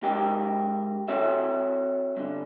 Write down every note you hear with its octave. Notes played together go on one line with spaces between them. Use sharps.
G#2 D#4 G4 A#4 G5
C4 F#4 A4 C#5 E5
G2 D3